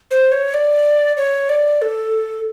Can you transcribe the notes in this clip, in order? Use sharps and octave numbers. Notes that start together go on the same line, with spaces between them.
C5
C#5
D5
C#5
D5
A4